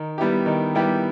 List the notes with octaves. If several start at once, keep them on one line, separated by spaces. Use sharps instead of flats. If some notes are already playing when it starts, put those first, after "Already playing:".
Already playing: D#3
G3 B3 E4 G4
D#3
G3 B3 E4 G4